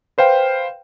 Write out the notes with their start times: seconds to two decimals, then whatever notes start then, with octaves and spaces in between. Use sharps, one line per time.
0.18 B4 C5 F5 G5